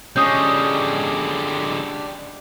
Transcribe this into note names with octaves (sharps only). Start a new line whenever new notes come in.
D3 G#3 C#4 D4 G4 D5 D#6 G6